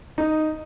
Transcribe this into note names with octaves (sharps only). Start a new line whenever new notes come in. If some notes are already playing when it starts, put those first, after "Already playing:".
D#4